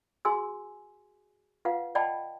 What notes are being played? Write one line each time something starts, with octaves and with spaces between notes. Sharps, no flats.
F#4 G#4 G#5 C6 E6
F4 B4 F5 F#5
D5 D#5 F#5 G5 A5 B5